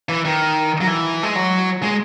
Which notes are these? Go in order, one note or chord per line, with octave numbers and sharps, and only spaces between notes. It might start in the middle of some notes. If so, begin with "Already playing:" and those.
E3
D#3
F#3
E3
G#3
F#3
G#3